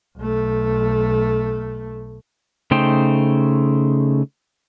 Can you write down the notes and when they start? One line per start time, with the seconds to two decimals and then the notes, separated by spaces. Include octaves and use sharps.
0.18 B1 A3
2.71 C#3 A3 D#4 C5 G5